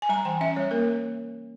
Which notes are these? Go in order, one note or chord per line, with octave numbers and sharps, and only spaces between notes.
G#5
G3 A#5
E3 G5
C#4 E5
G3 C#5
A#3 A#4